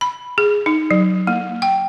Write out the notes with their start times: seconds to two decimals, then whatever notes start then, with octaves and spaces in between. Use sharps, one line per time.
0.01 B5
0.38 G#4
0.66 D#4
0.91 F#3
1.27 A#3
1.62 G5